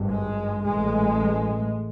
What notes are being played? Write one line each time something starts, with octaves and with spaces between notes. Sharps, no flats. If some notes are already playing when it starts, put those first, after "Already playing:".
Already playing: G#1 G2
G#3
A1 A2 G#3